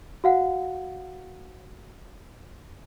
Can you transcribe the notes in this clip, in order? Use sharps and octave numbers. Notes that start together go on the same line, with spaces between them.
F#4 F5 F#5